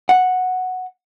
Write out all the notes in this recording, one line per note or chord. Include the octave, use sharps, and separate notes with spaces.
F#5